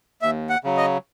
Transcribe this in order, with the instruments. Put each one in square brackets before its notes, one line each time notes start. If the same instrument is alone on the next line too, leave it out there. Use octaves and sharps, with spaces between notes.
[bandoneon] D#2 [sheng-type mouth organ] E5
[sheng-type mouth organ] F#5
[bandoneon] C#3 F#3
[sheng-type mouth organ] D#5